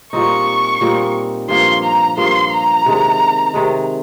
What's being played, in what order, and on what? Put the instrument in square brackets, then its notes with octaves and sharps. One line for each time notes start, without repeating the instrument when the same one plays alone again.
[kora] A#2 G3 C4 D#4 [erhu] C#6
[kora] A#2 G3 C4 D#4
[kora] G2 F3 A#3 [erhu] C6
[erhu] A#5
[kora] G2 F3 A#3 [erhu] C6
[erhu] A#5
[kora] C3 D#3 G#3
C3 D#3 G#3